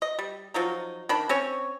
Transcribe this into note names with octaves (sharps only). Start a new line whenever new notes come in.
D#5
G3
F3 F#3 D#4
D#3 D4 B5
C4 C#4 C#5